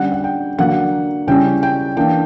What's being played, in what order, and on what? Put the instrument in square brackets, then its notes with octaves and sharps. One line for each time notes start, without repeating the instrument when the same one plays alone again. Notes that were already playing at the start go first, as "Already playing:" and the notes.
Already playing: [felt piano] D3 G3 C#4 F#5
F#5
G5
D3 F#3 A#3 F#5
C#3 G3 C#4 E4 G5
G5
E3 A#3 D4 G5